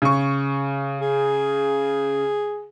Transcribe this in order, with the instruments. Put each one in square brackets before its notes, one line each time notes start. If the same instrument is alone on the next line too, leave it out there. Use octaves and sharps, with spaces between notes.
[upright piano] C#3 C#6
[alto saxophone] G#4